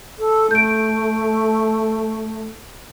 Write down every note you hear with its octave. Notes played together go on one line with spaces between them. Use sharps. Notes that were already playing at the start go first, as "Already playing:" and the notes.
A4
A3 G6 D7